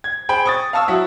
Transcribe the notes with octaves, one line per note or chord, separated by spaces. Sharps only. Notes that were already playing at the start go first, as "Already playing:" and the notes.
G#6
G#4 C5 G5 B5
C#6 D#6 A6
F5 A5 C#6 D#6 E6
F#3 E4 F#4 E5